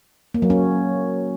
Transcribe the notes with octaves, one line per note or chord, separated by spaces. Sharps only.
A#3
F#3
C#4